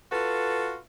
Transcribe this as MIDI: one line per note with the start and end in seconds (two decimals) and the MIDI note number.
0.12 0.77 65
0.12 0.77 66
0.12 0.77 69
0.12 0.77 71